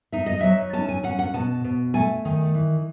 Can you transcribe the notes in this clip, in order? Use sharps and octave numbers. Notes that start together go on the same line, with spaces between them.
D#4 E5
D#5
F#3 E5
C#4 A5
G#5
C#4 F#5
F#5
B2 A5
B2
A3 G#5
D#3
E3